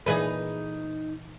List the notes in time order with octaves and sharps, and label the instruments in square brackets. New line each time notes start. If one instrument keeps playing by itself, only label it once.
[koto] A#2 E3 [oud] D#4 G#4 B4